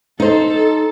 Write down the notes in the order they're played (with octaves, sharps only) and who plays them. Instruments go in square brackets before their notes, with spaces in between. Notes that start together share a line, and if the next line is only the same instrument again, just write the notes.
[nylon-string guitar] D#4 C5 [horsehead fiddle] A4